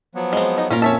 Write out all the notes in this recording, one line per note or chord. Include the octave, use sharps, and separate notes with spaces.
F3 F#3 B3
G#3 C4 G#4 D#5
D#4
A#2 A#3 C#4 F4 A#4
F2 C#4 C#5 E5 A5 E6